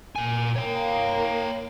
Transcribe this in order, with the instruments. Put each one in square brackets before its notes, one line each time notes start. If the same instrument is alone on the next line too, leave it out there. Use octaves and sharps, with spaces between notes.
[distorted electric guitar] A#2 G#5
[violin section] A#3 [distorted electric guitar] C#5 G5